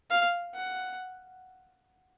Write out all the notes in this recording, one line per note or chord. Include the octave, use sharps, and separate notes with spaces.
F5
F#5